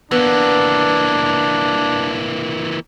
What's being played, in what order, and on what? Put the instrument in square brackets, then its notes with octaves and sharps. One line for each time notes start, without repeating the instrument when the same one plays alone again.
[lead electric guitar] E3 A#3 [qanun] B3 [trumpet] D4